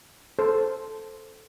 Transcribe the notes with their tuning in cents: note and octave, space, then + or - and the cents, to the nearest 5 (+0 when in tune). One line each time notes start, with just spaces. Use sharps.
A4 +0 C5 +0